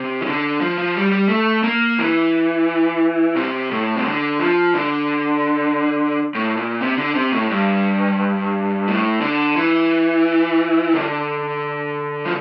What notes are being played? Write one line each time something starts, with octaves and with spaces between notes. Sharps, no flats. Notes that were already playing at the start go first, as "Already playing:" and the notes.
Already playing: C3
E3
D3
F3
F3
G3
G3
A3
A#3
E3
C3
A2
C3
D3
F3
D3
A2
A#2
C3
D3
C3
A2
G2
A2
D3
E3
D3
F3